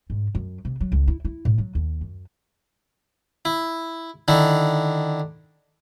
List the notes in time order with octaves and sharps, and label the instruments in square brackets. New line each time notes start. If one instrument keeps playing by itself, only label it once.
[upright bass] G#2
F#2
C3
F#3
C#2
E4
E4
A2
F#3
D#2
F#2
[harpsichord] E4
D3 D#3 D4 E4